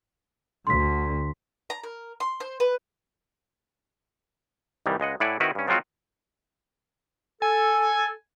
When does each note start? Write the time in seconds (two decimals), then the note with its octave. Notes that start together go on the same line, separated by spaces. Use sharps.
0.67 D2 D3 C6 B6
1.70 A#5
1.83 A#4
2.20 C6
2.40 C5
2.60 B4
4.86 C2 D#3 E3 G3
5.00 C#2 G#3 D#5 F#5
5.20 A2 E4 D5 F#5 G#5
5.40 D#3 C4 E4 F#4 A#4 B4
5.55 G2 C#4
5.67 F3 F#3 G#3 C4 F4 F#4
7.42 A4 G#5